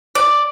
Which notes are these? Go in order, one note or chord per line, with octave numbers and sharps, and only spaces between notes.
D5